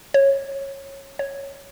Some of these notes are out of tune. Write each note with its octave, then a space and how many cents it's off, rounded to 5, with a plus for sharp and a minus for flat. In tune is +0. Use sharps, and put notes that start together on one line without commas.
C#5 -15
C#5 -5